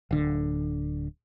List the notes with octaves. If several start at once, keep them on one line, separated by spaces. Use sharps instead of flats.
D1 D3